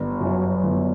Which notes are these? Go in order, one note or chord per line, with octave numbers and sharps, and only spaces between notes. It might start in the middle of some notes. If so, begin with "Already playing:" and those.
Already playing: G1
F#2 F#3
G1